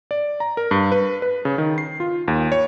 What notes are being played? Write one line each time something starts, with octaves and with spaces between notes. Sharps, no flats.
D5
A#5
A#4
G2
B4
B4
C#3
D#3
C7
F4
D#2
C#5